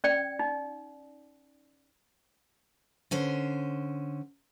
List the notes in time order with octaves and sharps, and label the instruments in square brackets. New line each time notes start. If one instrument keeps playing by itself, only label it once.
[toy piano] C#4 D5 G5
D#4
[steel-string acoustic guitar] D3 C#4 C5